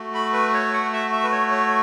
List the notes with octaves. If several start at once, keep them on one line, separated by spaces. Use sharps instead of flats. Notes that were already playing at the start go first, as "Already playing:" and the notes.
Already playing: A3 F#4
B5
B4
C#5
F#5
E5
E5
B4
C#5
C#5